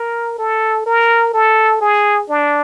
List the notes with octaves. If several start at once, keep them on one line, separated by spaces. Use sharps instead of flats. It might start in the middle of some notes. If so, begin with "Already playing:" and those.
Already playing: A#4
A4
A#4
A4
G#4
D4